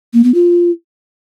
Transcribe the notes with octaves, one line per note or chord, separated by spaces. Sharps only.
A#3
B3
F4